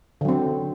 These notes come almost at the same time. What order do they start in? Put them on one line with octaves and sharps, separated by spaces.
D3 F#3 C4